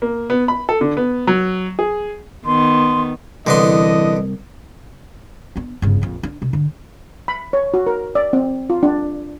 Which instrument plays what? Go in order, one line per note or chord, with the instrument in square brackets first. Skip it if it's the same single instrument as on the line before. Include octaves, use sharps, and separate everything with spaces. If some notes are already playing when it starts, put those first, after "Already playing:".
[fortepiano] A#3
B3
B5
A4
D3
B3
F#3
G#4
[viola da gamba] D#3 B3 [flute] C6
[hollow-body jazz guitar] C2 [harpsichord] D3 B3 C6 [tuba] E3 [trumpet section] D4 D#5
[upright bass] B3 D4
G1 C#3
A#1 F2
D4
C3
D3
[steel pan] B5
C#5
F#4
A#4
D5
C4
F4
D4